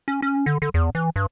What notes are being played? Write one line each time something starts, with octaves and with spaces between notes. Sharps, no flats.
C#4
C#4
D3
D3
E2
E3
G2